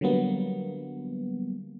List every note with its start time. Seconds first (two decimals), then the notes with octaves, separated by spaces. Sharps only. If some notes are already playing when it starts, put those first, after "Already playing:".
0.01 D3 F#3 G3 A#3 B3